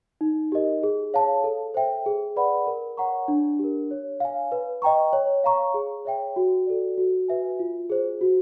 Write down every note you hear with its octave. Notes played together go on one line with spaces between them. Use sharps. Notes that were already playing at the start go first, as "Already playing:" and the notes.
D#4
G4 A#4 D#5
G#4
C#5 F5 A5
A4
C5 E5 G5
G#4
B4 D5 F#5 B5
A#4
C#5 F#5 A#5 C#6
D4
G4 A#4
C#5
F5 G#5
B4
D#5 G5 A#5 C#6
C#5
F5 A#5 C#6
G#4
C#5 E5 G5
F#4
A4 D5
F#4
B4 E5 G#5
F4
G#4 C5
F#4